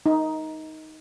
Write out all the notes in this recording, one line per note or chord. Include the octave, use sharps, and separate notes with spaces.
D#4